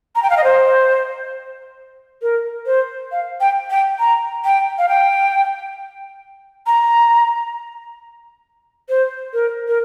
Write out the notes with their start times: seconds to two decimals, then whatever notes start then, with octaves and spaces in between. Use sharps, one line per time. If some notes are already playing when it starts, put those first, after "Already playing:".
0.15 A#5
0.23 G5
0.30 F5
0.37 D#5
0.44 C5
2.22 A#4
2.66 C5
3.12 F5
3.41 G5
3.70 G5
4.00 A#5
4.45 G5
4.78 F5
4.89 G5
6.67 A#5
8.89 C5
9.34 A#4
9.68 A#4